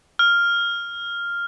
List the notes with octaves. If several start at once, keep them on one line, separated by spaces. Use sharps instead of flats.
F6